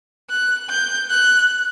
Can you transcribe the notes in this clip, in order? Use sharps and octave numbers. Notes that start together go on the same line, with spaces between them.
F#6
G6
F#6